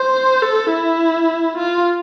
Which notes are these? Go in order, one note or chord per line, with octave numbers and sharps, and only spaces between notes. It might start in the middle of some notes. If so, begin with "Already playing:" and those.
Already playing: C5
A4
E4
F4